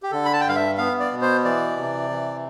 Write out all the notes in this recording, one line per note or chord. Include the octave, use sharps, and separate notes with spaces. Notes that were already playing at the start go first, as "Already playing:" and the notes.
G4
D3 A4
B5
A5
G5
G2 F5
E5
B3 F5
D5
B2
C5
E3 D5
C3
E3